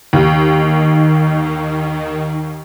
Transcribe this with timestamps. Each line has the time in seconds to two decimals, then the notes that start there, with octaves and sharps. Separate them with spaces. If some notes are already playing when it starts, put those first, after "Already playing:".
0.13 D#2 D#3